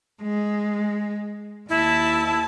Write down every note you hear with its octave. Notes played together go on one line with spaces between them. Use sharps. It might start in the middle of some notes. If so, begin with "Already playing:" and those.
G#3
D#2 E4 A5